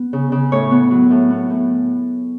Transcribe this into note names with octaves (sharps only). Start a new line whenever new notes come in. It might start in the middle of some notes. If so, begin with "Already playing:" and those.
Already playing: B3
C#3
C#3
A2 C#5
B3
F#3
A2
B3
A2